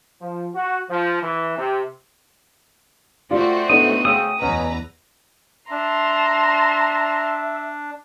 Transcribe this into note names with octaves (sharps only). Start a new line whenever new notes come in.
F3
F#4
F3
E3
C3
A3 C4 F4 F#4 D5
A2 B3 D4 D#4 D#6
C#3 G5 D#6 E6
E2 B2 C#4 B4 A#5
D4 E5 A5 A#5 C6